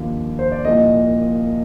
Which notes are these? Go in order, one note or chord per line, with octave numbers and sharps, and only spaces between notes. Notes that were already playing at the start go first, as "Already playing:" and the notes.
Already playing: D#2 D3 F3
C5
D5
C2 A#2 F3 D#5